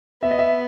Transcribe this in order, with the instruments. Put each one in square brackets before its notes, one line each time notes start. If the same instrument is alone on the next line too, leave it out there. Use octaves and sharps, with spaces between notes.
[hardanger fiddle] B3 [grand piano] E5
[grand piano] D#5
E5